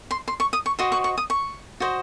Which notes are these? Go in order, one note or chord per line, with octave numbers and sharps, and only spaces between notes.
C6
C6
C#6
D#6
C#6
F#4 C5 D#5 D#6
C#6
C#6
D#6
C#6
F#4 C5 D#5